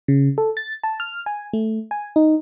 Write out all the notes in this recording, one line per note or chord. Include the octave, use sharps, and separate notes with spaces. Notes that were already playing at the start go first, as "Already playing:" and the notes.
C#3
A4
A6
A5
F6
G#5
A3
G#5
D#4